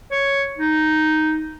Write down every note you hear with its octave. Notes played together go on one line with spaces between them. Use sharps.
C#5
D#4